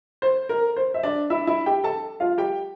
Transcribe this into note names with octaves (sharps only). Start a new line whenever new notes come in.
C5
A#4
C5
E5
D4 D5
E4 E5
E4 E5
G4 G5
A4 A5
F4 F5
G4 G5